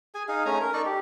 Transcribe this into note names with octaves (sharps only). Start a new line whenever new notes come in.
G#4 G#5
D#4 G#4 F5
A3 C#4 G#5 A#5
A#4
D#4 A4 D5 C#6
G4